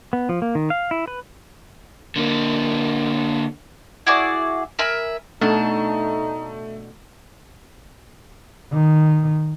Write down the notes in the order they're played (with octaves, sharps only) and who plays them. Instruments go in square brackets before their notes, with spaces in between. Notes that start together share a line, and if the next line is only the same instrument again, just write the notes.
[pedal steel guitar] B3
F3
A#3
D#3
F5
E4
B4
[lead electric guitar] D3 A#3
[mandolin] E4 F#4 G#4 D5
A#4 E5 G#5 B5
[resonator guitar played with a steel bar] B2 D4 A4 [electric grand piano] A3 [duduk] D#4
[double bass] D#3